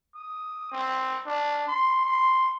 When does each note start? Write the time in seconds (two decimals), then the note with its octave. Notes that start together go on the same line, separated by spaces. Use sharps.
0.15 D#6
0.72 C4
1.26 D4
1.68 C6
2.05 C6